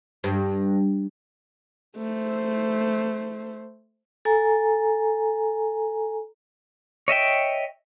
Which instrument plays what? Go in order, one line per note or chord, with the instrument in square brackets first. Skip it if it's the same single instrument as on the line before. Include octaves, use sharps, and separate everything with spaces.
[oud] G2
[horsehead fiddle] A3 C5
[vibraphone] A4 G#5 A#5
[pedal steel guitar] C#5 D#5 E5 G5